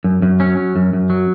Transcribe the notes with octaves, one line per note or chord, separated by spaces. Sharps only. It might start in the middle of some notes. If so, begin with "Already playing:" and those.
F#2
F#2
F#3 C#4
C#4
F#2
F#2
F#3